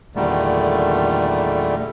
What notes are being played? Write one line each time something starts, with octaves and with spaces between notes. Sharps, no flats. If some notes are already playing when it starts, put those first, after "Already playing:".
E2 A#2 D3 D#3 G3 A3